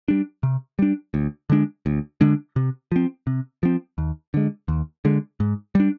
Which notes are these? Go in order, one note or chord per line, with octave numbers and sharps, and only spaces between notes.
G3 D4
C3
G3 D4
D2
D3 G#3 D4
D2
D3 G#3 D4
C3
F3 C4
C3
F3 C4
D#2
D3 G#3
D#2
D3 G#3
G#2
G3 D4